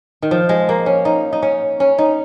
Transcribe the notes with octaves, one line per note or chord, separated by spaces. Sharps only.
D#3
F3
G#3
A#3
C#4
D#4
D#4
C#4
C#4
D#4